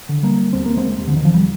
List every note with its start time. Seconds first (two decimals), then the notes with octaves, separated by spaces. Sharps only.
0.09 D3
0.23 G3 A#3
0.53 D#2 C4
0.66 A#3
0.77 G#3 C4
0.99 D#2
1.08 D3
1.16 D#3
1.25 F3
1.34 G3